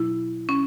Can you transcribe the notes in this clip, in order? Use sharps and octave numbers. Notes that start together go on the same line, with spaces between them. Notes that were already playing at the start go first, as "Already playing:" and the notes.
Already playing: B2 F#3 E4
C#4